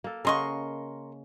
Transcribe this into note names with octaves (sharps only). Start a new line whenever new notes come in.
A#3 A4
C#3 A#4 D#5 F#5 C6 C#6